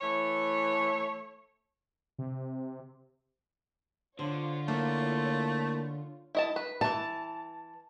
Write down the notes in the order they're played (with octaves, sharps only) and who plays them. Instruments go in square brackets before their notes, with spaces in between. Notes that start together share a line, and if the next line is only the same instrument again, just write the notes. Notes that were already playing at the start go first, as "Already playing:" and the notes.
[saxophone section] E3 A3 C#5
[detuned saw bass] C3
[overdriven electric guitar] D3 [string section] F4 C#5 [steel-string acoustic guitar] C5
[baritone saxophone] A3 [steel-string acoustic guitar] A#3 E4
[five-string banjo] E4 D#5 A5
B4
[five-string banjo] D#3 E3 [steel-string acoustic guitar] A5